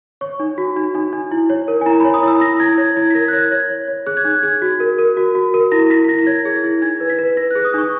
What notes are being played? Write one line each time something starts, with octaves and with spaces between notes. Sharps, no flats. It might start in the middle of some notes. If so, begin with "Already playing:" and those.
C#5 C#6
D#4
F#4
D#4
D#4
D#4
E4
C#5
A#4
G#5
E4 A#5
B5
C#5
D#6
E4 E6
E4 A#6
E4 G#6
C#5
E4 G#6
B6
A#4 A#6
F#6
C#5 G#6
C#5
C#5
C#5
G#4 F#6
G#6
D#4 F#6
G#4 G#6
F#4
A#4
A#4
F#4
F#4
A#4
E4 A#6
E4 B6
B6
E4 A#6
A#6
C#5 G#6
G#4
E4
D#4 G#6
B4
B6
B4
B4 A#6
F#6
G#4
D#6
D#4 C#6